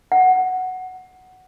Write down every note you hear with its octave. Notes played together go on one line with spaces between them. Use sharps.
F#5